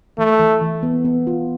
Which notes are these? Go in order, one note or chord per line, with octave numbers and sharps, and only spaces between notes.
E3 A3
E3
E3
B3
B3
F4